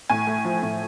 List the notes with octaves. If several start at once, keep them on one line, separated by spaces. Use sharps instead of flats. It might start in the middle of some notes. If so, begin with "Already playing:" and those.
A2 G#5
A3
F3
A2